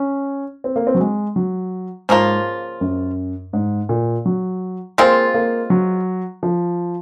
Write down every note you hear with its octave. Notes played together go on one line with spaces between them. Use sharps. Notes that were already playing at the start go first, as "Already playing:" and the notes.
Already playing: C#4
C4
A#3
C4
F#3
G#3
F#3
G#2 C#3 F3 A#3 F4
F#2
G#2
A#2
F#3
G#3 A#3 C4 F4
A#3
F#3
F3